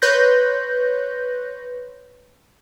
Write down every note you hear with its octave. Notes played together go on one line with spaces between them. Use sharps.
B4 C#5 C6 F#6 G6 A#6